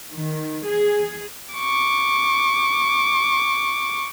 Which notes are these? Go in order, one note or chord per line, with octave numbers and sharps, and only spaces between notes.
D#3
G#4
C#6 D6